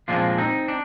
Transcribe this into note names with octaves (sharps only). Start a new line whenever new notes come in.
A#2 F3 G#3 C4 D4 F4
C4 D#4
D4